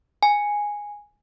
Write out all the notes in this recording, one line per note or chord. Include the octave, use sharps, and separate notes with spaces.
G#5